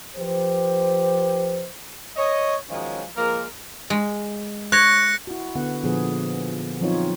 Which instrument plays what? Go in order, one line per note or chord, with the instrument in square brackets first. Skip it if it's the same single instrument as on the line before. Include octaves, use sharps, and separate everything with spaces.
[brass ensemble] F3 G4 B4 C5
[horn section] C#5 D#5
D#3 F3 F#3 G#3 C#4 D#4
F3 G#3 A#3 A#4
[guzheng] G#3
[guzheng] C#5 [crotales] F#6 A#6 C#7
[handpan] E4 F#4
D3 B3 F#5
A#2 D3 F3 B3 G#4
F3 F#3 C4 D#4 F4 C#5